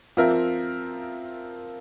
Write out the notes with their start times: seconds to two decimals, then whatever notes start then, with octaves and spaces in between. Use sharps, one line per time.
0.17 F3 C4 F4 A#4 E5